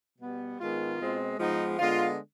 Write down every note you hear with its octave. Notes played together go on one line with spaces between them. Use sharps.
B2 G3 B3
G#2 D#3 G#3 B3 F4
B2 G#3 C4
G#2 F3 G#3 B3 D#4
D3 G#3 B3 F4